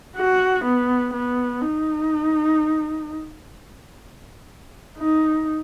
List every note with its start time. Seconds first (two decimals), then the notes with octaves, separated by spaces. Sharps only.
0.17 F#4
0.64 B3
1.13 B3
1.61 D#4
4.98 D#4